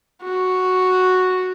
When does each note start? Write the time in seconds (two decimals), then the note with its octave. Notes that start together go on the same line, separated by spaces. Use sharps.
0.23 F#4